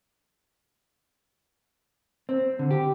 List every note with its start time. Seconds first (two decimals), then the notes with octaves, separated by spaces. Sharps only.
2.29 C4
2.59 D3
2.71 G4